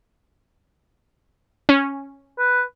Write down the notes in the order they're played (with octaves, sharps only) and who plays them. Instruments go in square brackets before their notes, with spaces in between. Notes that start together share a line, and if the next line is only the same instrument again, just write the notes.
[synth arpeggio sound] C#4
[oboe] B4